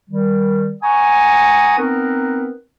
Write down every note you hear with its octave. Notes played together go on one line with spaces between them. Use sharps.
D#3 G3
F#5 G#5 A#5 C#6 D#6
B3 C4 D#4 A#4 B4